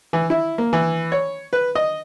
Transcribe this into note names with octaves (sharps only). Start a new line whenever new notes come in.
E3
E4
A#3
E3
C#5
B4
D#5